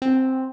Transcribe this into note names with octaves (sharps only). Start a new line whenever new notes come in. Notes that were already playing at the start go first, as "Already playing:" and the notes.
C4